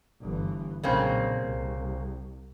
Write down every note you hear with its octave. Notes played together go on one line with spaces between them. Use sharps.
G1 E3
B1 A#2 C#3 A#3 C4
C2